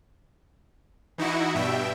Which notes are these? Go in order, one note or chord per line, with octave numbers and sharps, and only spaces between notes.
E3 D#4 E4 F#4
G2 B2 E5 G5